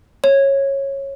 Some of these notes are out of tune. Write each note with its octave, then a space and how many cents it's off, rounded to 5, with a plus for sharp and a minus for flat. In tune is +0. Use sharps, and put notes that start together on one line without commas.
C#5 -15